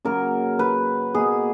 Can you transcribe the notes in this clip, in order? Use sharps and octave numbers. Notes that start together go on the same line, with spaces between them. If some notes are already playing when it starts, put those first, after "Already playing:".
C#3 F#3 A#3 A#4
B4
B2 A#3 G#4